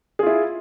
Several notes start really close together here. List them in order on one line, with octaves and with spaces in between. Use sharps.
G#4 F4 E4